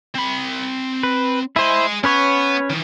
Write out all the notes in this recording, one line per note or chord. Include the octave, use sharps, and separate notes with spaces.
C4 B5
B4
E4 G#4 C5 D#5
B3 C#4 B4 C#5
D#3 E3